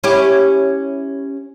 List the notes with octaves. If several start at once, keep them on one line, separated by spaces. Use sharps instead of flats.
C#4 E4 G4